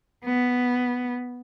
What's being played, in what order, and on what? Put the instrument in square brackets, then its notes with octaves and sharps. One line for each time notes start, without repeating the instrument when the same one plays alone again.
[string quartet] B3